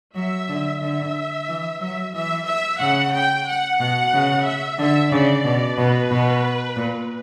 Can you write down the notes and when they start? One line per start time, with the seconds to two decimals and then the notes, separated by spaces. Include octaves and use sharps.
0.15 F#3 E5
0.49 D3
0.81 D3 E5
1.48 E3
1.81 F#3 E5
2.14 E3 E5
2.47 E5
2.81 C#3 F#5
3.13 G5
3.47 F#5
3.79 B2 F#5
4.13 C#3
4.46 E5
4.79 D3 E5
5.12 C#3 D5
5.45 B2
5.78 B2 B4
6.11 B2
6.77 A#2